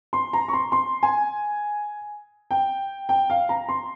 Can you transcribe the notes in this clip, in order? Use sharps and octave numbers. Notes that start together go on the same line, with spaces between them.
C6
A#5
C#6
C6
C6
G#5
G5
G5
F5
A#5
C6